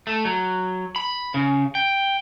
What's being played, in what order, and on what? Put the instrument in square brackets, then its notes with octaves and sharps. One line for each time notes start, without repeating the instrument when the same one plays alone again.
[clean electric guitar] A3
F#3
B5
C#3
G5